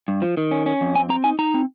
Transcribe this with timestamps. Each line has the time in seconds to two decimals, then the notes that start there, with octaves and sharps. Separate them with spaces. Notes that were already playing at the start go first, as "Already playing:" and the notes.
0.08 G2
0.22 F3
0.37 D#3
0.51 C#4
0.66 C#4
0.81 F2
0.95 C4 G#5
1.09 C4 A#5
1.24 D#4 G#5
1.39 D#4 A#5
1.54 C4